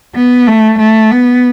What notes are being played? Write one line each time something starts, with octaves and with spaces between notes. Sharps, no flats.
B3
A3
A3
B3